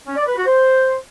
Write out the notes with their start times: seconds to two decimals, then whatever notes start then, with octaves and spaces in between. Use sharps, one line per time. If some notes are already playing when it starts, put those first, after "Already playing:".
0.07 C#4
0.17 D5
0.26 B4
0.36 F#4
0.46 C5